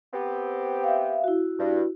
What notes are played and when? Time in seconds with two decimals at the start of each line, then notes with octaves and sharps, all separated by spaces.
0.14 B3 C4 G4
0.84 E5 F5
1.24 E4 F#4
1.59 G2